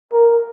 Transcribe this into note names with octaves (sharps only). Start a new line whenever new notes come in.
A#4